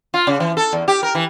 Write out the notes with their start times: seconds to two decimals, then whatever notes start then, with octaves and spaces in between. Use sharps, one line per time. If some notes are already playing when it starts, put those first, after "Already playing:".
0.14 F4
0.27 C#3
0.40 E3
0.57 A4
0.73 E2
0.88 G4
1.03 A#4
1.15 E3